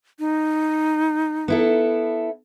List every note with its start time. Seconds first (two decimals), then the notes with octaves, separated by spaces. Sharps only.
0.19 D#4
1.48 B3 E4 A4